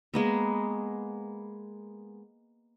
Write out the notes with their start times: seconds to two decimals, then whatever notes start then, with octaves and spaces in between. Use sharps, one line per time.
0.14 G#3 A#3 B3